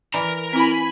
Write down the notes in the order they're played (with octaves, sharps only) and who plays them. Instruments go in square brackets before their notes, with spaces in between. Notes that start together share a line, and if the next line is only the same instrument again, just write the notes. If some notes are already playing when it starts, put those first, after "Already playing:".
[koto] E3 [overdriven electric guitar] A#4 A#5 [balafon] D5
[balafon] C4 E4 [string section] G#5 B5